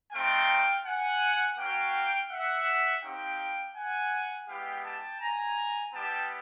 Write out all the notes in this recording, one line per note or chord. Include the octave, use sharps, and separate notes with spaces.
A3 C4 D#4 F5 G5
F#5 G#5
A#3 C#4 F#4 F5 G5
E5 F#5
C4 D#4 G4 F5 G5
F#5 G#5
G#3 B3 E4 G4 F5 G5
G5 A5
G#5 A#5
G3 B3 E4 G4 G5 A5